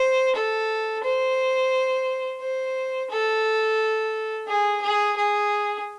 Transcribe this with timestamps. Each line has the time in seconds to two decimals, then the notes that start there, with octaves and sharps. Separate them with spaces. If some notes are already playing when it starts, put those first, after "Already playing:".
Already playing: C5
0.35 A4
1.04 C5
2.40 C5
3.10 A4
4.48 G#4
4.82 G#4
5.17 G#4